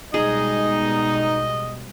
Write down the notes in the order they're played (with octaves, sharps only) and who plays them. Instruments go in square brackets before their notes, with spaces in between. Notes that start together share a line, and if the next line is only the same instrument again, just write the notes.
[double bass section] B2 G3 G#3 [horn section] D#4 [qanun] G#4 [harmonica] D#5